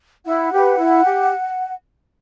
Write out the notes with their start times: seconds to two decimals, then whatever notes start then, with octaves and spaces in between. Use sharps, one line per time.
0.25 E4 F#5
0.52 G4 B4
0.78 E4
1.04 G4